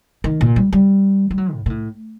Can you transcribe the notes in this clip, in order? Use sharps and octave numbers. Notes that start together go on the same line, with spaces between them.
D#3
A#2
G3
G3
G3
F#3
A2
A#2
A2